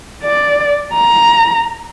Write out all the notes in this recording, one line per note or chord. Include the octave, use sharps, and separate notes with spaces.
D5
A#5